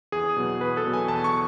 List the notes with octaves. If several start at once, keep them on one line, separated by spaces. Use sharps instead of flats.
E2 G#4
B2 F#3 B3
E2 B4
A4
B2 F#3 B3
G#5
E2 A5
C#6